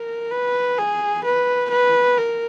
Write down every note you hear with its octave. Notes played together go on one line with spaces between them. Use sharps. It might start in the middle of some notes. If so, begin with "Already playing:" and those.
Already playing: A#4
B4
G#4
B4
B4
A#4